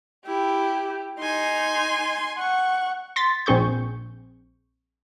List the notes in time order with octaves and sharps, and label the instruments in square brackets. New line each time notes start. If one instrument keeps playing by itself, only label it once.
[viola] E4 [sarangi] G4
[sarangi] D#4 [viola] G#5 C6
[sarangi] F#5 [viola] C#6
[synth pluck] C6 A6 B6
A#1 C4 G#4 C#6 G6